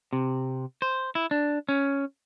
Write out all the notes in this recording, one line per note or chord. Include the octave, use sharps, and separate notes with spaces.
C3
C5
E4
D4
C#4